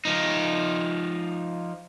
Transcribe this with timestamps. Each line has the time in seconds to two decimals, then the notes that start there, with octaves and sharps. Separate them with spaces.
0.05 F3 D#4